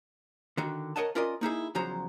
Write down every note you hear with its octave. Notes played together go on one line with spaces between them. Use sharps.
D3 D#3 F#4
A#4 C#5 D#5 F#5 A5
C#4 F4 A#4 D5 D#5
A#3 D#4 E4 G#4
E2 C#3 F3 F#3 C5 A#5